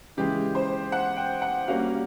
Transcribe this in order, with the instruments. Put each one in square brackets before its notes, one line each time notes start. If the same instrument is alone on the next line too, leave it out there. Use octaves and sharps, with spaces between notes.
[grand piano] C#3 E3 G#3 [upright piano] G4
[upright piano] C5
F#5
G5
F#5
[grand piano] G3 A#3 C#4 F#4 [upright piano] F5